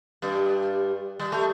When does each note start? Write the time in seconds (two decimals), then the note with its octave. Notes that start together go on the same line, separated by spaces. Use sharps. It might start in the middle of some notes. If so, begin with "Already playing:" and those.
0.22 G2 G3
1.20 G3
1.32 A3